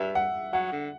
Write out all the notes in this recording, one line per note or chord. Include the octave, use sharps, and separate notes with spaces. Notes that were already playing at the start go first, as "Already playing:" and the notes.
Already playing: G2 E5
F#5
F#3 F#5
D3